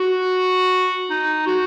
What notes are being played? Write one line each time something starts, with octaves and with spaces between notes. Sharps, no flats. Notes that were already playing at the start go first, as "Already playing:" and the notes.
Already playing: F#4
D#4
F#4